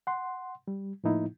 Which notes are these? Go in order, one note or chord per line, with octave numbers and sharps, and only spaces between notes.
F#5 C6
G3
A2 F3 A#3 D#4 E4